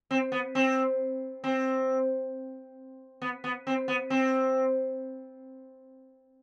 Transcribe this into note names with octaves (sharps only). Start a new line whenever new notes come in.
C4
B3
C4
C4
B3
B3
C4
B3
C4